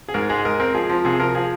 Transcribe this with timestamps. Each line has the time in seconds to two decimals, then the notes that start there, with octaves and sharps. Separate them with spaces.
0.08 G#4
0.14 G#2 A#4
0.29 G#3 G#4
0.45 G#3 A#4
0.60 C4 A#4
0.74 F3 G#4
0.90 F3
1.05 C3 G#4
1.19 F3 A#4
1.35 F3 G#4